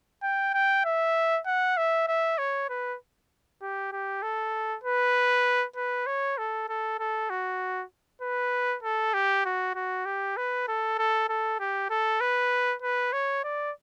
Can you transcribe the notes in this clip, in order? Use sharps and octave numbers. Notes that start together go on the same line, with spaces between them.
G5
G5
E5
F#5
E5
E5
C#5
B4
G4
G4
A4
B4
B4
C#5
A4
A4
A4
F#4
B4
A4
G4
F#4
F#4
G4
B4
A4
A4
A4
G4
A4
B4
B4
C#5
D5